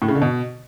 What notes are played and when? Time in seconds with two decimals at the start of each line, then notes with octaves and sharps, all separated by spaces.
0.02 A2
0.08 C#3
0.15 D3
0.22 B2